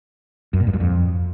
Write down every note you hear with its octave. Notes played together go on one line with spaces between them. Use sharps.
F#2
A#2
G2
F#2
F2